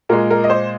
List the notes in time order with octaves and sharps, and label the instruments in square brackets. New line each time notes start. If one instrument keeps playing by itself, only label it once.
[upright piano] A#2 G#3 A#4
A#4
D#5
C5